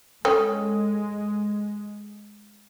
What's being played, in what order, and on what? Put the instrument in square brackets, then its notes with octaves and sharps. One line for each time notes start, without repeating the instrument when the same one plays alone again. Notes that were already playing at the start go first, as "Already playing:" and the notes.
[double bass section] G#3 [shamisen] C#4 [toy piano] A4 G5 D#6